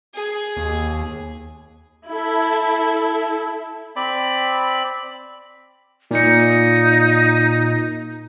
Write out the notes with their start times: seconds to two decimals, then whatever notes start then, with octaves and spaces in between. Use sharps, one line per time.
0.14 G#4
0.57 D#2
2.07 E4 A4
3.96 C4 D5 B5
6.11 A#2 D#4 C#7